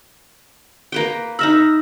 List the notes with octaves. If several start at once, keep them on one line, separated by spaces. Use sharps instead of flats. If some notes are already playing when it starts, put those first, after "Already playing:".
A#3 B4 G5
D#4 E5 B5 E6 F6 A#6